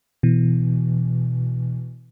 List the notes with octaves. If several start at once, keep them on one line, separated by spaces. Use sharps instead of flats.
B2 E3